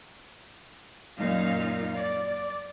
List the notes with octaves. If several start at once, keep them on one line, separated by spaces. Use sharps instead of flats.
F#2 A#2 D#4 F5
D5